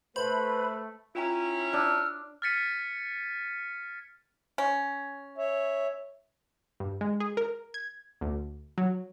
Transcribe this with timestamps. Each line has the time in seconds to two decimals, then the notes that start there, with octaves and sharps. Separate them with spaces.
0.16 A3 B4 C5 B5
1.15 C#4 E4 F4 G5 A#5
1.73 D4 E6 F6
2.42 F6 G#6 A6 B6 C#7 D#7
4.58 C#4
5.38 C#5 E5
6.80 G2
7.01 G#3
7.20 G#4
7.37 A#4
7.74 G#6
8.21 D2
8.78 F#3